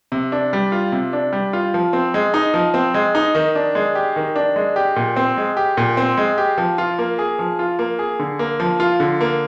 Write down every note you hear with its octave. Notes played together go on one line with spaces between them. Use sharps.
C3
D4
G3
F4
C3
D4
G3
F4
F3
C4
G#3
D#4
F3
C4
G#3
D#4
D#3
D4
G#3
G4
D#3
D4
G#3
G4
A#2
C4
G#3
G4
A#2
C4
G#3
G4
F3
F4
A#3
G#4
F3
F4
A#3
G#4
D3
A#3
F3
F4
D3
A#3